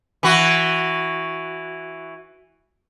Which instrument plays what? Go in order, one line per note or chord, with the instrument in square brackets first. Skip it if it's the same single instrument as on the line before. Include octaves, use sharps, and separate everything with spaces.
[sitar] E3 F#4